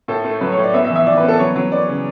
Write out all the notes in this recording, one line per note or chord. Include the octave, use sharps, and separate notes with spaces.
A2 A4
A3
F#3 B4
C#5
A2
D5
B3 E5
E5
E3
E5
E3 D5
B4
B3
A4
F#3 C#5
F#3
B3 D5
C#3